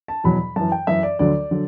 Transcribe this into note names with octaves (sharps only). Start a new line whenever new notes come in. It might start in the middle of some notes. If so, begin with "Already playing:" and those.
A5
E2 B2 F#3 B5
F#2 E3 A5
G5
F#2 E3 E5
D5
D2 D3 F#3 D5
D3 F#3